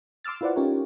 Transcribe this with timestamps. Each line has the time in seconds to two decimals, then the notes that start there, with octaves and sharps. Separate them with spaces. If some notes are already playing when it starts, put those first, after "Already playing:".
0.24 C6 D6 E6 F6 A6
0.41 E4 F4 B4 C5 D5 F#5
0.56 C#4 D#4 F4 G4 A#4 C#5